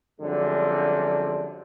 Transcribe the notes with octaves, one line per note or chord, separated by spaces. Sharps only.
F#2 D3 F3 G3 G#3 C4